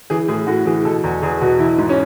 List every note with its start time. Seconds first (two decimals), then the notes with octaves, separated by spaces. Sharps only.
0.10 E3 G#4
0.28 A2 G#4
0.47 A2 F#4
0.66 E3 G#4
0.85 B2 A4
1.04 E2
1.22 E2 G#4
1.41 B2 F#4
1.59 E3 E4
1.78 G#2
1.89 C#4